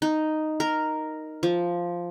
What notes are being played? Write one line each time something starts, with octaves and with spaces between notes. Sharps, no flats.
D#4
A#4
F3